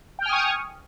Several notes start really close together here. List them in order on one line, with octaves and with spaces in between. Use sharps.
G5 F6 G#5 D#6 C#6